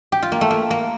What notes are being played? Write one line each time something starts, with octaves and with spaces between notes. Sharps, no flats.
G4
F4
A#3
A3
A#3
A#3